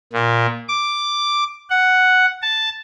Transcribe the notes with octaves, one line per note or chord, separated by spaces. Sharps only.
A#2
D6
F#5
A5